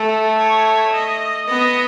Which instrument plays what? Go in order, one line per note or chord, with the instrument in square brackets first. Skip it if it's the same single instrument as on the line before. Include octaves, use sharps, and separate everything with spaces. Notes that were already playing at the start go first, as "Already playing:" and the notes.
Already playing: [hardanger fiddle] A3 [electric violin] A4
[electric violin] C#5
D#5
[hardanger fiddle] B3 [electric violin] D#5